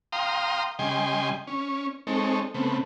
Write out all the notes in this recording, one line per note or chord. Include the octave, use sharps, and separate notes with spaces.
F5 G5 A#5 C6 D#6
C#3 G3 D#5 G5 G#5 C6
C#4
G#3 C4 D#4 A4 C#5
C#3 A3 B3 C4